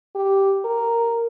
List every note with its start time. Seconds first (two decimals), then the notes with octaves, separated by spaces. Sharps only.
0.15 G4
0.65 A#4